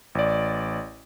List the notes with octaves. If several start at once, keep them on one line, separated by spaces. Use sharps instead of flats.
A1 D5